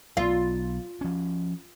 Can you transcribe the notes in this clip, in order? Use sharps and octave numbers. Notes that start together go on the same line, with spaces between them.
B1 F4
F3 C#4